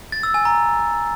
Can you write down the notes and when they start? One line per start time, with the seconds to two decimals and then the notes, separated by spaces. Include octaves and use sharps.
0.12 A6
0.23 E6
0.34 G#5
0.45 A#5